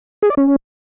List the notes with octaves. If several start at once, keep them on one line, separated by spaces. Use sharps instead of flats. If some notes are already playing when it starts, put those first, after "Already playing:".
G#4
D5
C#4